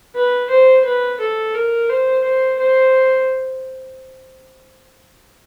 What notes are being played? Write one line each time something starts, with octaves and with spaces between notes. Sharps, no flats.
B4
C5
B4
A4
A#4
C5
C5
C5